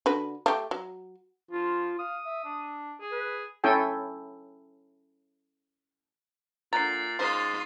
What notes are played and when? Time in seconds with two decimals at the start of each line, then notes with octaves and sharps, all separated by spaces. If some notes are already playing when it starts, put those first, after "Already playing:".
0.06 D3 F#4 B4
0.46 A3 G4
0.71 F#3
1.51 F3 F4
1.99 F5 D#6
2.25 E5
2.44 D4
3.00 G#4
3.12 B4
3.64 C#4 E4 A4 G5 G#5
6.73 A#2 D3 A#5 A6 C7
7.19 G#2 C#4 F4 A#4 C5